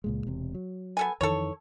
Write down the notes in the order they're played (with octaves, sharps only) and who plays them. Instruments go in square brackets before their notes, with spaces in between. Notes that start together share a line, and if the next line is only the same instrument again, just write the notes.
[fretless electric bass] C#2 A#2 G#3
E1 C3
F#3
[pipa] B3 A4 G#5
[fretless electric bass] F2 D#3 E3 [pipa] A4 C#5